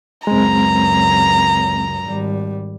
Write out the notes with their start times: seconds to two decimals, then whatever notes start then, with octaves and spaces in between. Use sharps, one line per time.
0.27 C#2 F#2 G#3 C4 A#5
2.05 G#1 G3